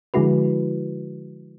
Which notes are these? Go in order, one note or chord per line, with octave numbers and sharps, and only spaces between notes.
D3 F3 G#3 E4 F#4 B4